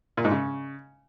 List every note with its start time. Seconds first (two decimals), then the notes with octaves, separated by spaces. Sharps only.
0.17 A#2
0.24 G#2
0.32 C#3